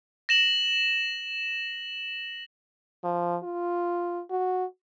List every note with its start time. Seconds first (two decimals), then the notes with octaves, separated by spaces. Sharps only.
0.29 A#6 E7 F#7
3.04 F3
3.43 F4
4.30 F#4